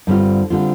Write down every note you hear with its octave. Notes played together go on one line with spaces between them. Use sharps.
G2 D3 G3 C4 F4
D3 G3 C4 F4